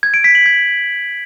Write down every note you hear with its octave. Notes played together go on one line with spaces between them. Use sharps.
G#6
D7
B6
F#7
G#6